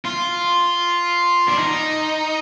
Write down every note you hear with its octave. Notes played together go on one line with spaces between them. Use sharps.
F4
D4
D#4